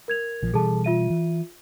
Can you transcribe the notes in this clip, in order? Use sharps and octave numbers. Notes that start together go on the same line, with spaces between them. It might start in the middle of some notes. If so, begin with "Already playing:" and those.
A#4 G#6 F7
A#1 F3
B2 E3 G3 G#4 A4 A5
F4 E5 D#7
E3